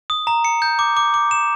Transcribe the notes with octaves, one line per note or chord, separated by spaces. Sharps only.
D#6
A#5
C#7
G6
D6
D6
D6
E7